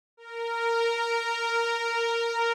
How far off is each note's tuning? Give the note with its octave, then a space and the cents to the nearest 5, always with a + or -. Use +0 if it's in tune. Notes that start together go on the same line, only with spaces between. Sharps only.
A#4 -10